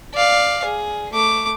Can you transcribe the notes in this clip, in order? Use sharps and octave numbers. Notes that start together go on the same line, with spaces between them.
D5 F5
G#4
A3 D6